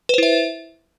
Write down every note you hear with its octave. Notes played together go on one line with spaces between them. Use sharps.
E4 B4 C5 E5